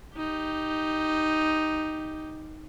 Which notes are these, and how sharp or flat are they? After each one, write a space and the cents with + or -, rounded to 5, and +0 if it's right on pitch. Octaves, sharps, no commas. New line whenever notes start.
D#4 +0 G4 +0